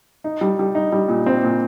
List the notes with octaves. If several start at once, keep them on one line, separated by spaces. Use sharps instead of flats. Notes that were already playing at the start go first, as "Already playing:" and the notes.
D#4
G3
G3
D#4
G3
A#2
C4
A#2